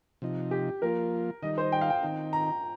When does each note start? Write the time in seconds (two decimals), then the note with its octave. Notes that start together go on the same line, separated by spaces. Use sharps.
0.22 C3 F3 D#4
0.51 G4
0.82 F3 A#3 F4 A#4
1.42 D#3 G3 D#4 D#5
1.58 C5
1.72 G5
1.81 F5
1.90 G5
2.03 D#3 C4 D#4
2.33 A#5